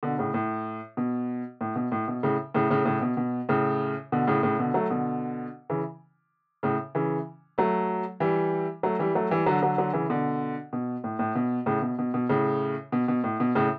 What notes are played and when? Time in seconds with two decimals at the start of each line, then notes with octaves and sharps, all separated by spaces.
0.03 B2 D3
0.18 A2 C#3
0.34 A2
0.97 B2
1.61 A2
1.76 B2
1.92 A2
2.08 B2
2.23 A2 C#3
2.54 A2 C#3
2.70 A2 C#3
2.85 A2 C#3
3.01 B2
3.17 B2
3.49 A2 C#3
4.12 B2 D3
4.27 A2 C#3
4.43 A2 C#3
4.59 B2 D3
4.74 F#3 A3
4.90 B2 D3
5.70 C#3 E3
6.63 A2 C#3
6.95 C#3 E3
7.58 F#3 A3
8.20 E3 G3
8.83 F#3 A3
8.99 E3 G3
9.15 F#3 A3
9.30 E3 G3
9.46 D3 F#3
9.62 D3 F#3
9.78 D3 F#3
9.93 C#3 E3
10.09 B2 D3
10.73 B2
11.04 A2
11.19 A2
11.35 B2
11.66 A2 C#3
11.82 B2
11.99 B2
12.14 B2
12.29 A2 C#3
12.92 B2
13.08 B2
13.24 A2
13.40 B2
13.55 A2 C#3